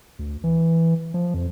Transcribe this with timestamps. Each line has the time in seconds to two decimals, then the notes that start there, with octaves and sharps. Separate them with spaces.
0.19 D2
0.44 E3
1.14 F3
1.34 F2